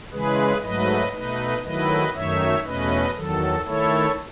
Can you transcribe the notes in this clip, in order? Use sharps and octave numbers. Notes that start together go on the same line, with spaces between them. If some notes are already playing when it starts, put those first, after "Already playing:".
C#3 E3 G#3 G#4 B4
G#2 F#3 A3 B4 D#5
B2 A3 D#4 B4 D#5
D#3 F#3 A3 E4 B4 D#5
F#2 D#3 A3 D#4 C#5 E5
E2 B2 A3 C#4 B4 D#5
E2 D#3 F#3 A4
D#3 A3 E4 A4 C#5